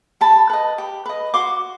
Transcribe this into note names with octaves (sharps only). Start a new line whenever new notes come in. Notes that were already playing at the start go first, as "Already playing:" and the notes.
G4 A5 B5
B4 D#5
G4
B4 D#5
F#4 C6 D6